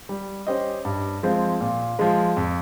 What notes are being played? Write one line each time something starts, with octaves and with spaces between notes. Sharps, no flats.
G3
C#4 G4 C5 D#5
G2
F3 G#3 C4
A#2
F3 G#3
F2